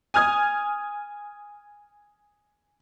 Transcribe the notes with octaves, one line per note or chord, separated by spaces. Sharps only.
G#5 D#6 F6 G#6